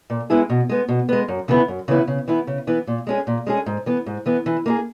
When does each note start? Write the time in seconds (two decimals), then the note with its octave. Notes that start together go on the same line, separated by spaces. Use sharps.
0.10 A#2
0.30 G#3 B3 E4 G#4
0.50 B2
0.69 G#3 B3
0.88 B2
1.09 G#3 B3
1.28 F#2
1.48 C#3 E3 B3 E4
1.68 F#2
1.88 C#3 E3 B3 E4
2.08 C#3
2.28 E3 B3 E4
2.47 C#3
2.67 E3 B3 E4
2.87 A#2
3.07 G#3 C#4 G#4
3.27 A#2
3.47 G#3 C#4 G#4
3.66 G#2
3.86 E3 B3
4.06 G#2
4.26 E3 B3
4.46 E3
4.66 A#3 E4 G#4